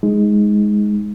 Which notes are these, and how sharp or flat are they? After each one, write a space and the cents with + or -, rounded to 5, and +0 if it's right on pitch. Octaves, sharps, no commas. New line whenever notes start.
G#3 +0 D#4 +15